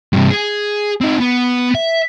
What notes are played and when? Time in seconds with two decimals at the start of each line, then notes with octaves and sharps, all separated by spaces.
0.13 G2 C3
0.30 G#4
1.01 C4 D#4
1.20 B3
1.75 E5